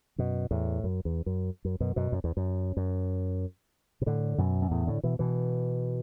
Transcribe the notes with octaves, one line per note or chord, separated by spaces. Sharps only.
F#2 B2
E2 A2
F#2
E2
F#2
F#2
F#2 B2
F#2 B2
F#2
E2
F#2
F#2
B2
A2 D3
F#2 B2
F#2
E2 A2
A2 D3
B2 E3
B2 E3